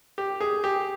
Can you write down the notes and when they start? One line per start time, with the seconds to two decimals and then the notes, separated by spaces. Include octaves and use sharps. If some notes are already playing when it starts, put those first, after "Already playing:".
0.18 G4
0.40 G#4
0.64 G4